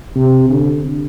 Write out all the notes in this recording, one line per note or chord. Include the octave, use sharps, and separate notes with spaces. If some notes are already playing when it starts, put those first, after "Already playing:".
C3
D3